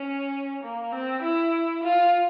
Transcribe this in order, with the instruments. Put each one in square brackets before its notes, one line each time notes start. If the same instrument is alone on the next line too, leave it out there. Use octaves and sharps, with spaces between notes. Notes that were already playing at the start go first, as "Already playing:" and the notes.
Already playing: [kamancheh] C#4
A#3
C4
E4
F4